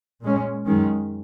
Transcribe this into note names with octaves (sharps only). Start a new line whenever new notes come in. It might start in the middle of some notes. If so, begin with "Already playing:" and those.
A#2 G#3 C#4
F#2 D#3 G#3 C#4